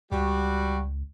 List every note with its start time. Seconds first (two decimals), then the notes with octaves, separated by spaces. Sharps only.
0.12 C#2 G3 F#4